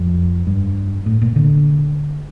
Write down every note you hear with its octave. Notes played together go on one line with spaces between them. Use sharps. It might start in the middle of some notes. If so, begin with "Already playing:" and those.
Already playing: F2
G2
A2
A#2
D3